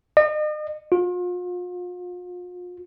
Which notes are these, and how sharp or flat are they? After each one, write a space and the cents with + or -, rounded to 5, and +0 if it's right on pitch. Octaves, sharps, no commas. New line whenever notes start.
D#5 -40
F4 +40